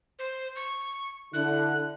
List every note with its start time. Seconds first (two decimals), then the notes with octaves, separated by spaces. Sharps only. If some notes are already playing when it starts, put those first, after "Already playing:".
0.19 C5
0.56 C#6
1.34 D3 E4 F#6